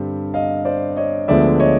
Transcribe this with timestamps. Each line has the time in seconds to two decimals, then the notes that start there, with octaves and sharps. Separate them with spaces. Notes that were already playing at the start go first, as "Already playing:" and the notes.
Already playing: G2 D3 G3 C4
0.34 D#5 F5
0.65 C5 D5
0.97 C#5 D#5
1.28 D2 D3 F3 G#3 B3 D5 E5
1.60 C#5 D#5